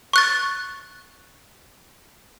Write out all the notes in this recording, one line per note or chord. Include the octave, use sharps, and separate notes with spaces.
C#6 F#6 A6